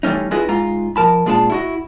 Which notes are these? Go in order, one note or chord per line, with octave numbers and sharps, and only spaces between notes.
E3 G3 A3 C#4 D#4
C#4 E4 F4 G#4 B4 D#5
G#2 F4 A#5
F3 A#4 A5 B5
A#2 G#3 D4 F4 A5
E4 F#4 D#5